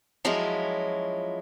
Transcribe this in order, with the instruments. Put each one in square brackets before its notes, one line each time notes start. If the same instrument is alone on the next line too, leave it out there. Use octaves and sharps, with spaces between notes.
[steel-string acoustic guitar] F3 F#3 G#3 C#4 E4 F4